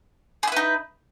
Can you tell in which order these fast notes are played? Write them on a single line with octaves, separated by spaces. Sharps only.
G#4 E4 B4 D#4